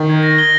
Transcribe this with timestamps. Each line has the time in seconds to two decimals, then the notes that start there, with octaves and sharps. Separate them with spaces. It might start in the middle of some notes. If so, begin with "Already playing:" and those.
Already playing: D#3
0.10 G#6
0.23 A#6
0.38 G7